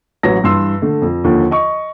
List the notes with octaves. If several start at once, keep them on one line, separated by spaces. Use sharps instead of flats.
A1 F#3 B4 C#5 A#6
G2 E3 C6 E6
D3 A3
F2
D#2 D3 F3
D#5 C#6